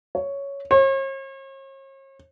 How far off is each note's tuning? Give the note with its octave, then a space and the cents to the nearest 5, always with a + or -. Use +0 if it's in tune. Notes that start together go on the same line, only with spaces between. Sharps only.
C#5 +5
C#5 -45